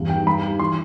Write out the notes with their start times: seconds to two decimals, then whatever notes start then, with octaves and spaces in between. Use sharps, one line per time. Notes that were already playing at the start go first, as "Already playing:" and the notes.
Already playing: E2 G2
0.10 D#3 G5
0.27 G2 B5
0.43 D#3
0.59 E3 C6